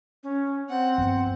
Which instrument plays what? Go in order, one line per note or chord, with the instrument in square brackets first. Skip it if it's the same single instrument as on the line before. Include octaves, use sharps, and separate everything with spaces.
[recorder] C#4
[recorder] C4 [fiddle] F#5
[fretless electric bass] G2 F3 B3